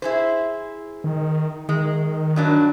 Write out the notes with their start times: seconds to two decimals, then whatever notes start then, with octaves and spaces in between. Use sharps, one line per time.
0.02 E4 G#4 C5
1.04 D#3
1.69 D#3 G#3
2.36 G2 F#3 D4